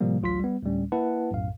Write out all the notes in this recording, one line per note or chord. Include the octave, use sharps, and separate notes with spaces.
A2 C3 F3 G3 A#3
A1 D2 F#3 F4 C6 B6
G3 B3
D2 A2 G3 C#4
A#3 E4 B4 F#5 A5
B1 F#2 A2 F5